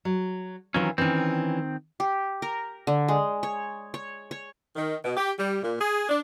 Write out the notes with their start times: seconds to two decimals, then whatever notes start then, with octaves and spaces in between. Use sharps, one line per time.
0.05 F#3
0.74 D#3 E3 F#3 C4 C#4 F4
0.98 D#3 E3 C4 C#4
2.00 G4
2.42 A#4
2.87 D3
3.08 G#3
3.43 C#5
3.94 C#5
4.31 C#5
4.75 D#3
5.04 B2
5.17 G4
5.38 G3
5.62 A#2
5.79 G#4
6.08 D4